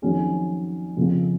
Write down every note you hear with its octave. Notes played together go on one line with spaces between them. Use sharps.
F2 D#3 F#3 C#4 G#4
F2 C#3 F3 C4 F4